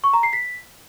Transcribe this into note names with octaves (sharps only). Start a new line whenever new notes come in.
C#6
A#5
C7
B6